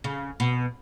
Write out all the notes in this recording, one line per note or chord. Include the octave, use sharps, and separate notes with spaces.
C#3
B2